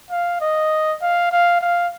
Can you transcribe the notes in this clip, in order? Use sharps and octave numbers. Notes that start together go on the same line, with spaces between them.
F5
D#5
F5
F5
F5